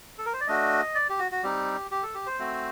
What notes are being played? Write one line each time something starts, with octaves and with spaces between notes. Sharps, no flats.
A4
A#4
C5
D5
A3 D4 F#4 D#5
D5
G4
F#4
F#4
G3 C4 D#4 G4
G4
A4
G4
C5
A3 C4 F#4